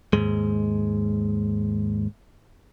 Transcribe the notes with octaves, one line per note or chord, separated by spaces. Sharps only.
D#2 G#2 G#3